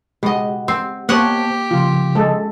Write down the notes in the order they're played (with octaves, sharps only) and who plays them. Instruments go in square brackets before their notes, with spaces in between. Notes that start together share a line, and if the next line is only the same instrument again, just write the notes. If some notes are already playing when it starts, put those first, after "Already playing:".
[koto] B2 D#5 [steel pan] G#3 [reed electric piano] G4 F#5
[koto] C4
[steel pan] A#3 [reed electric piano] B3 C5 A5 [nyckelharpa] G4 [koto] C#5 D#5 F#5
[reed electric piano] C#3 F3 [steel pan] F4
[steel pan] G#3 A4